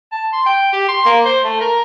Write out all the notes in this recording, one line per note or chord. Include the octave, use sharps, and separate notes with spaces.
A5
C6
G5
G4
C6
A#3
C5
A3
A#4